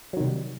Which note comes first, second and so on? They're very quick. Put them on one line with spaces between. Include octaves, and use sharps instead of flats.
F#3 D#3 C3 G3